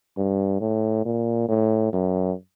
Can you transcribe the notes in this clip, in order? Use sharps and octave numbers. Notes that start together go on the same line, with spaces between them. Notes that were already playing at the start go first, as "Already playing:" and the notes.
G2
A2
A#2
A2
F#2